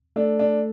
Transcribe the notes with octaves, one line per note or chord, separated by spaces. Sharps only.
A3 D4 A4
D4